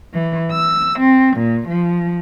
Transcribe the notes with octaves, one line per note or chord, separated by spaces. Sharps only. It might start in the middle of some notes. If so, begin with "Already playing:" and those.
E3
E6
C4
A#2
F3